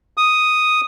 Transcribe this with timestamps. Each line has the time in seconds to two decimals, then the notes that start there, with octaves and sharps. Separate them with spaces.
0.17 D#6